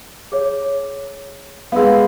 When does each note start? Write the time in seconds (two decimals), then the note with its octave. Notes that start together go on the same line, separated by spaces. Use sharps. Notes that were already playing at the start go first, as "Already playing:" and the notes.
0.32 G#4 C#5
1.72 G#3 B3 F5 E6